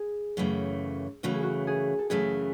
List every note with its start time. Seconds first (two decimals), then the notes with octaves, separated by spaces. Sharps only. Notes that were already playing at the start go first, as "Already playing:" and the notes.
Already playing: G#4
0.37 F#2 C#3 E3 A3
1.23 F#2 C#3 E3 A3 F#4
1.34 G#4
1.43 F#4
1.67 G#4
1.99 A4
2.10 F#2 C#3 E3 A3 G#4